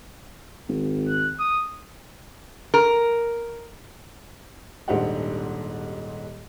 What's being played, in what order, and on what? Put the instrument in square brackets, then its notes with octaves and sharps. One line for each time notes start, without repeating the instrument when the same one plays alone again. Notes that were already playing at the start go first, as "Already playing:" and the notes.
[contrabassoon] G#1
[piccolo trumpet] F#6
D#6
[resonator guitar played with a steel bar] A#4
[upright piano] D#1 G#2 D4 G4 C5 F#5